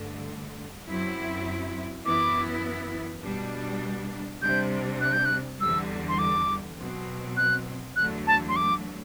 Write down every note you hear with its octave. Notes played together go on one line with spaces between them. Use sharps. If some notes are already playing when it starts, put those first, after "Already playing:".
Already playing: G2 D3 A3
F#2 F#3 C4 E4
F#2 E3 B3 E4 D6
B2 G3 D4
C3 G3 D4 G6
F#6
G6
F#6
E2 D3 G3 E6
C6
D6
B2 F#3 C4
F#6
E2 D3 F#3 A3 F#6
A5
C6
D6